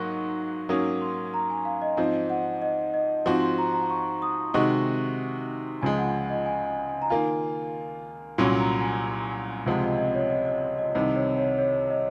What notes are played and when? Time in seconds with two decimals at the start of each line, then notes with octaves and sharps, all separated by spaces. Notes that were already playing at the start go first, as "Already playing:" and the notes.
Already playing: G#2 F#3 A#3 D#4 F#4 C6 C#6
0.69 G#2 F#3 A#3 C#4 D#6
1.01 C6
1.34 A#5
1.50 G#5
1.65 F5
1.82 D#5
1.97 G#2 F3 C4 D#5
2.30 F#5
2.62 D#5
2.94 D#5
3.25 G#2 F3 C4 F#4 C6
3.42 C6
3.58 A#5
3.74 A#5
3.90 C#6
4.22 D#6
4.54 C3 D#3 G#3 D#4 F#4 C#6
5.82 C#2 C#3 F3 G#3 G#5
5.98 F#5
6.30 D#5
6.46 G#5
6.67 G#5
6.89 G#5
7.02 A#5
7.10 D#3 A#3 F4 G#5
8.38 C2 A#2 F#3 C#4 C6
8.60 A#5
8.81 G#5
9.66 C#2 C3 F3 G#3 F#5
9.83 D#5
9.98 D#5
10.14 C#5
10.30 D#5
10.46 D#5
10.79 D#5
10.95 C2 C3 D#3 D#5
11.15 C#5
11.37 C#5
11.58 C#5
11.90 D#5